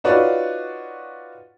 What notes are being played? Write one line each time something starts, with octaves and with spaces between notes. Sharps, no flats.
D#4 F4 F#4 B4 C#5 D5